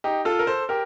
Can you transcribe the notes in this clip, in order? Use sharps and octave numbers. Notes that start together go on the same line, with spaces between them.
D#4 G4
F4 A4
A#4
A4 C5
G4 A#4